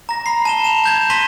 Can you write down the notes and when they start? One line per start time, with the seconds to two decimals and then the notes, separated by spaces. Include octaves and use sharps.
0.09 A#5 A#6
0.26 B5 C7
0.45 A5 E7 G7
0.64 E7 F7
0.84 A5 G6 G#6
1.10 C6 A#6 B6 D#7 G7